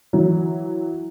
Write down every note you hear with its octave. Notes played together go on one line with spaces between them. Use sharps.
E3 F#3